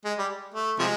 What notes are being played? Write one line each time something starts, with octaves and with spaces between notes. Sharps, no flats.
G#3
G3
A3
C3 F3 G#3